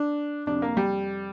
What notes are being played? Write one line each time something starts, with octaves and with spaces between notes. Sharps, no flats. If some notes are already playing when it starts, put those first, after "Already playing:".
Already playing: D4
F2 C3 D4
A#3
G3